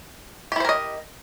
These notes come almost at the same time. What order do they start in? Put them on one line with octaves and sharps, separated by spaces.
G4 E4 C5 A#4 D#5